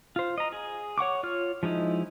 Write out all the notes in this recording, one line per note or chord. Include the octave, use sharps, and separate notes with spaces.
F4 C5
D#5 A#5
G#4
C#5 F#5 C#6 D6
F4 C#5 F6
F3 G#3 D#4 E4